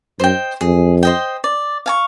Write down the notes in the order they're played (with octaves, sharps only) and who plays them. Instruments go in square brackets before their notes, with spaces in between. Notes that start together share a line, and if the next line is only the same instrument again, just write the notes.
[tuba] F#2 [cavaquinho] C5 D#5 G5
[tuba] F2 [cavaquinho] G#4
[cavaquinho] C5 D#5 G5
D5
F5 G#5 C#6